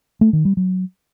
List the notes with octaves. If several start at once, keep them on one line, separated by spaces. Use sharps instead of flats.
A3
D#3
G3
F#3